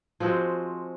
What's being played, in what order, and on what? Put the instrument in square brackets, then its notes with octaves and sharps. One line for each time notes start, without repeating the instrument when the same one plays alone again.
[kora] F3 G#3 C4 F#4